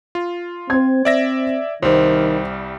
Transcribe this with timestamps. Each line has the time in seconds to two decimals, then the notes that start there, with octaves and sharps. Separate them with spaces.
0.15 F4
0.70 C4 C5 G#6
1.05 C4 D5 E5 A#6
1.82 C2 D#3 G3 C5